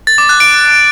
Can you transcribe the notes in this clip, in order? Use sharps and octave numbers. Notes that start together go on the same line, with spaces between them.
A6
D6
F#6
D7